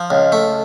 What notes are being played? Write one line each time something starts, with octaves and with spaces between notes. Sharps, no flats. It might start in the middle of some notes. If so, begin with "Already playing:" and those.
Already playing: F3
C#2
A3